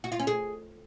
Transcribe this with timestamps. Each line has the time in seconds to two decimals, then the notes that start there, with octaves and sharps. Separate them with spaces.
0.04 F#4
0.12 F4
0.19 C#4
0.27 G#4